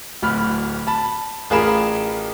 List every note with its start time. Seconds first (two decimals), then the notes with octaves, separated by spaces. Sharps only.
0.22 D1 D2 B5 F6
0.87 A5 B5
1.50 A1 F4 G#4 A#4 B5 E7